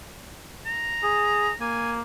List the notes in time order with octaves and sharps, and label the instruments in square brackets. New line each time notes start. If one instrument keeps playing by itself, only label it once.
[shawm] A#5
[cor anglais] G#4
[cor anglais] A#3 [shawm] G#5